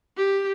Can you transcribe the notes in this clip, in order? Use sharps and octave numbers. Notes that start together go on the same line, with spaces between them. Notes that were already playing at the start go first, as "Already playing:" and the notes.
G4